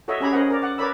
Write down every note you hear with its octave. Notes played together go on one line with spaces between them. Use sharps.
F#4 A4 C#5 D#5 E5
C#4 G4 G#4 C#5 A#5 B5
C#4 G#4 A#4 C5 D#5 F#5
A#4 D5
D5 F#5
A#4 B4 C#5 D5 B5 E6